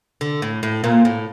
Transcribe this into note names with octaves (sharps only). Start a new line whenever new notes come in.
D3
A2
A2
A#2
A2